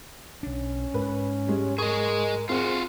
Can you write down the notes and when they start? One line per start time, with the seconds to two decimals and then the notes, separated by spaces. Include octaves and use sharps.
0.43 B1 C#4 D4
0.94 G#2 B4
1.47 G3 G#3 C#5
1.78 G#4 A#4 D#5 C#6
2.49 C4 F4 F#4 G#4